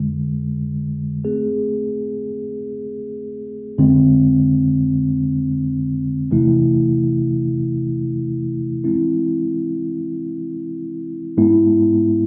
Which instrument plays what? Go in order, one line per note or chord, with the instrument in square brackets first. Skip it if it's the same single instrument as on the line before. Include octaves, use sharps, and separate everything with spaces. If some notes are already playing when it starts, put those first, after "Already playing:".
Already playing: [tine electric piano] F2 D3 G#3
A3 C4 G#4
F2 D3 G#3 C4
E2 C3 E3 A3 E4
E3 G#3 C4 E4
G#2 G#3 B3 E4